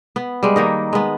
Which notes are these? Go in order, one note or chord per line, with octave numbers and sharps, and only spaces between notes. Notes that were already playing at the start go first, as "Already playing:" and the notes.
B3
G3 G#3
D#3 A#3 D#4
G#3 B3